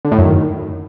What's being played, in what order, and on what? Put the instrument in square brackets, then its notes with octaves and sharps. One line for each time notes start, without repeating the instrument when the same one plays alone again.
[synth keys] D3
A2
F#2
D#3